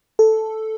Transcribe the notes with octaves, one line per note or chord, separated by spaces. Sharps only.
A4